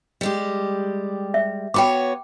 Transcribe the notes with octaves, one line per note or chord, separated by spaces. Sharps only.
G3 G#3 G4
E5
B3 F#4 C#5 G5 B5 D6